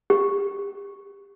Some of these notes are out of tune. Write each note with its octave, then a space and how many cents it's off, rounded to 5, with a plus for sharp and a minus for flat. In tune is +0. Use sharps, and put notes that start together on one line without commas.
G4 +35